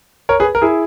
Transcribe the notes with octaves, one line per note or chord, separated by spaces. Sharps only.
A#4 C#5
G#4 B4
A#4
E4 G#4